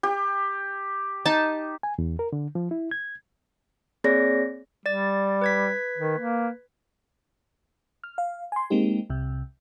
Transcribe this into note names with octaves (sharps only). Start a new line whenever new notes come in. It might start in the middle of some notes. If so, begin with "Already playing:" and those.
G4
D#4 A5
G#5
E2
A#4
D3
F3
E4
G#6
A#3 C4 G#4 C#5 D5 A#6
G3 D5 A6
B4 G#6 B6
D#3
A#3
F6
F5
G#5 C6
G#3 A#3 C4 D#4 G4
C2 C3